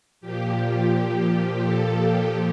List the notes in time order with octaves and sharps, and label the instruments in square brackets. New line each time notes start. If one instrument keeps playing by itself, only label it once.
[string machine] A#2 F3 G4
G4
A4
G4